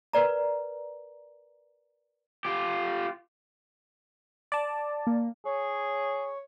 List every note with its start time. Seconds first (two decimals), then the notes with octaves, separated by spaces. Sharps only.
0.13 A#4 B4 D5 A#5
2.45 F4 G4
4.52 D5 A5
5.07 A#3
5.45 G#4 C#5